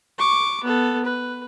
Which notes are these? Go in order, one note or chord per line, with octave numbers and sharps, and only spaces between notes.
C#6 D6
B3 A4
B4